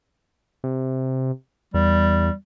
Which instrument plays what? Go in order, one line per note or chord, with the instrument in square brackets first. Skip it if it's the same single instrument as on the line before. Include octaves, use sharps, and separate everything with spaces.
[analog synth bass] C3
[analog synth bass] E2 [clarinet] G3